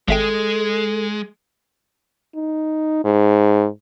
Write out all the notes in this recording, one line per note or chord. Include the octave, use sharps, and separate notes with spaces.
G#1 G#3 A4 E5 G5
D#4
G#2